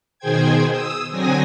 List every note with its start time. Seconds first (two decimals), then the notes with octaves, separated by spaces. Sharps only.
0.19 B2 D#3 G#4 C5 G5 G#6
0.69 D#6 E6
1.11 D3 F#3 C4 G#5 D#6 A#6